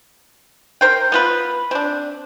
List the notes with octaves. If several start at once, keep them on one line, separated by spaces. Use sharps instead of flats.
A#4 C5 G5
B3 F4 B4
C4 D4